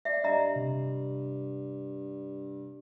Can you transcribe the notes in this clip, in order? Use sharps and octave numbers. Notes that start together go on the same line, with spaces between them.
D5 E5 C7
G2 D#5 E5 A#5
C3